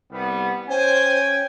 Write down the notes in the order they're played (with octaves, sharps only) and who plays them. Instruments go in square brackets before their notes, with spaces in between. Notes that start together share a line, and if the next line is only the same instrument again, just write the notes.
[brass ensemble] C2 G3 B3
[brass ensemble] C#4 G5 G#5 [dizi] C5